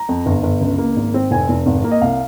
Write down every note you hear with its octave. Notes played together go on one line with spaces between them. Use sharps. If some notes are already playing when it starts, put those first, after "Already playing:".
Already playing: A#5
F2
G1
G1
C#2
A#3
G#1
C4
F1 G#5
F1
G#1
A#3
D#5
C2 F5